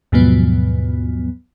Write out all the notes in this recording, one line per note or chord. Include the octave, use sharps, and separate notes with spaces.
D#2 G#2 B2 F3 F#3 B3